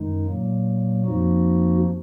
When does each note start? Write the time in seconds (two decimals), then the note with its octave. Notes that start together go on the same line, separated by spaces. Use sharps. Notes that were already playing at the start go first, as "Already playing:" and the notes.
Already playing: F#2 D#3 G#3 D#4
0.26 A#2 F#3 A#3
1.05 F2 F3 A#3 D#4 F#4